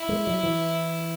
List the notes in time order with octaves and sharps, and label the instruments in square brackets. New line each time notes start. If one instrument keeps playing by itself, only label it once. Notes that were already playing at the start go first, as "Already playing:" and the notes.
Already playing: [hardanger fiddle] E4
[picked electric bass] G#3
F#3
E3